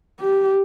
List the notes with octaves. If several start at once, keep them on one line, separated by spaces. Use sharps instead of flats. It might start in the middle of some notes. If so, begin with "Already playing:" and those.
G4